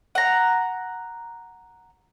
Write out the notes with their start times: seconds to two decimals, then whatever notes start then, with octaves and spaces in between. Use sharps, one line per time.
0.15 F#5 A#5